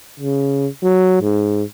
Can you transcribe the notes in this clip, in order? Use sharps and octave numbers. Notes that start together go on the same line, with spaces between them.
C#3
F#3
G#2